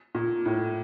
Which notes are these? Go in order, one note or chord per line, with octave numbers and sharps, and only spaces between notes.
A#2
A2